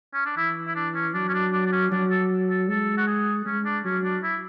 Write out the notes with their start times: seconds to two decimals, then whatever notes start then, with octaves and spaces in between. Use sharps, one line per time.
0.14 C#4
0.26 D4
0.37 E3 E4
0.68 E4
0.76 D4
0.95 C#4
1.14 F#3 D4
1.29 C#4
1.34 D4
1.53 D4
1.66 D4
1.72 C#4
1.91 F#3 D4
2.10 A4
2.50 A4
2.69 G#3 A4
2.98 F#4
3.07 G#4
3.46 G#3 C#4
3.65 D4
3.84 F#3 C#4
4.04 D4
4.23 E4